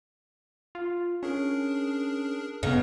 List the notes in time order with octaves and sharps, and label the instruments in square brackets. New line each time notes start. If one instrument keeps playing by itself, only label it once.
[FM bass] F4
[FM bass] C#4 [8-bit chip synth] D4 G#4 A#4
[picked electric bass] G2 B3 [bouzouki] C#3 [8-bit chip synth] B4 D#5 A#5